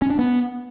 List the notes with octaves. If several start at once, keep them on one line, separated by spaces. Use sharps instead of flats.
C#4
D4
B3